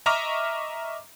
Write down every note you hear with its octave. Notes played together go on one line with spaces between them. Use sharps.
D#5 E5 A#5 C#6 D6 F6